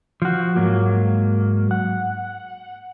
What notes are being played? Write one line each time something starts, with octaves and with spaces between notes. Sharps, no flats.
F3 F#4
G#2 F#3 A#3
F#5